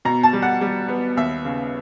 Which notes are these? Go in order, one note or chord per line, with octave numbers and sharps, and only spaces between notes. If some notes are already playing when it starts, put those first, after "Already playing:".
B2 A#5
A5
G3
F#5
G3
B3
D#2 E5
C#3